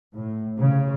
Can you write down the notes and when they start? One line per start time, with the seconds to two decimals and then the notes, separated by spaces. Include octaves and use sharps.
0.15 A2
0.57 C#3